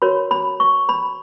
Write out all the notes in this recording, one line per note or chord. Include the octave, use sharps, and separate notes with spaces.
F#4 A#4 C#5 B5
B5
C#6
B5